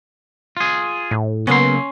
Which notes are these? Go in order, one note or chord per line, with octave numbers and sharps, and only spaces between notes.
F4 G#4
A2
C#3 F#3 A#3 B3 C#4 C6